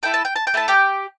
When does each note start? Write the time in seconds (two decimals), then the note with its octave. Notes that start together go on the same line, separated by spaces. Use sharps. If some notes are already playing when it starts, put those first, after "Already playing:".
0.03 A3 E4 A4 G5
0.14 A5
0.25 G5
0.36 A5
0.47 G5
0.54 A3 E4 A4 A5
0.68 G4 G5